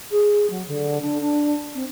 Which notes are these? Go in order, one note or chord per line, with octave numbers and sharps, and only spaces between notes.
G#4
F#3
D3
D4
D4
C4